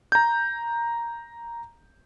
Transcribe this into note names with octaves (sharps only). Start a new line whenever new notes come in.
A#5 G6